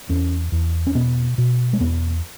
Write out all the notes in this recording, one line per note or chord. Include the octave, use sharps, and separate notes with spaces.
E2 C#4
E2
C#4
B2 B3
B2
G#3
E2 B3